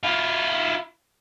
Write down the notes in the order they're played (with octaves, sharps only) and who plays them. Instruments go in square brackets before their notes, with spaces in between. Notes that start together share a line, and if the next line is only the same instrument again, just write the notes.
[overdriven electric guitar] E4 F4